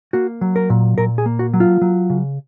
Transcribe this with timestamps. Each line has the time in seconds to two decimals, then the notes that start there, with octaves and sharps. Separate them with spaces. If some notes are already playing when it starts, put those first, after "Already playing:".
0.13 A#3 F#4
0.41 F#3
0.56 A#4
0.70 A#2
0.98 A#2 A#4
1.18 G#4
1.26 A#3
1.39 F#4
1.54 F#3
1.60 F4
1.82 F#3
2.10 C#3